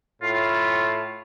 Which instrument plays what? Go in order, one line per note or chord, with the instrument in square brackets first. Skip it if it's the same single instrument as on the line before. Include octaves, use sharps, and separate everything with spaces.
[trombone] A2 [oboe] F4